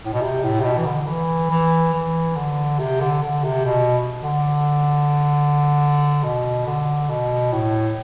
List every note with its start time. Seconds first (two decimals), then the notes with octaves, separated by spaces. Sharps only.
0.05 A2
0.13 B2
0.21 C3
0.43 A2
0.60 C3
0.64 B2
0.77 E3
0.85 D3
1.07 E3
1.50 E3
1.93 E3
2.36 D3
2.79 C3
3.01 D3
3.22 D3
3.44 C3
3.65 B2
4.23 D3
6.23 B2
6.66 D3
7.09 B2
7.52 A2